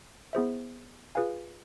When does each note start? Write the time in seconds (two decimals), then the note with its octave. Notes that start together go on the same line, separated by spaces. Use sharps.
0.33 B3 E4 G#4 C5 E5
1.15 F4 G#4 B4 F5 G#5